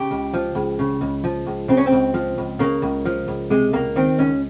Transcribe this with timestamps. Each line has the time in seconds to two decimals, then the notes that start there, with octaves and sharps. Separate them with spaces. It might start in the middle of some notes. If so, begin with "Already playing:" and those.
Already playing: C#3 G4
0.11 C#2
0.34 F3
0.55 C#2
0.79 C#3
1.01 C#2
1.24 F3
1.46 C#2
1.68 C#3 C4
1.77 C#4
1.86 C4
1.92 C#2
2.14 F3
2.38 C#2
2.59 C#3 A#3
2.82 C#2
3.05 F3
3.28 C#2
3.50 C3 G#3
3.73 C#2 A#3
3.96 D#3 C4
4.18 C#2 C#4